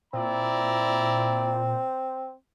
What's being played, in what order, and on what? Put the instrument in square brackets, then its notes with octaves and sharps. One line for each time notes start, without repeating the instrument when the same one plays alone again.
[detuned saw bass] A#2 [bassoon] C4 [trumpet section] E4 D5 A#5